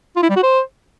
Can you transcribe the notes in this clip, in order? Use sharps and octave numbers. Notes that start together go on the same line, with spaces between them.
F4
E4
G3
F#4
C5